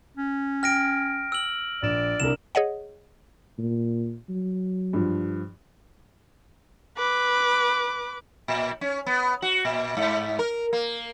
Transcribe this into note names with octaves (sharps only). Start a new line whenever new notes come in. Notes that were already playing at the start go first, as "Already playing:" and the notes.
C#4
G5 F6 A#6 D7
E6 F#7
A#1 D5 E7
C2 D4 A#4 E7
G#4 C#5 D#5 F#5
A#2
F#3
G2 F3
B4 D6
A#2
C#4
B3
F#4
A#2
G#2
A#4
A#3